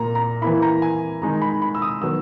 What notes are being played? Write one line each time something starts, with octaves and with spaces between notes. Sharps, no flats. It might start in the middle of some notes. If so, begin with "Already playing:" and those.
Already playing: A#2 A#3 A#5
A#5
E3 A#3 E4 B5
A#5
G#5
D#3 G#3 D#4 A#5
B5
B5
E6
D#6
D#3 F#3 B3 E6